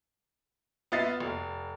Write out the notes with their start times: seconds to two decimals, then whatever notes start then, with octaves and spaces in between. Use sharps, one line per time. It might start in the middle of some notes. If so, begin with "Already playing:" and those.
0.92 B3 F4 D#5 E5 A6 C7
1.20 F1